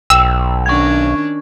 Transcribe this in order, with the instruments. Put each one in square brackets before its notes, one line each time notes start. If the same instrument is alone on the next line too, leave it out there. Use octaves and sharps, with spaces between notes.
[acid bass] B1 [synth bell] G5 [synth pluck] E6
[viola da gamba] D#3 C#4 D4 [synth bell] C#6 G#6